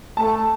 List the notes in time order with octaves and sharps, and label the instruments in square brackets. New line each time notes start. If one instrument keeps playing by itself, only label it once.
[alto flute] A3 [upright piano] A5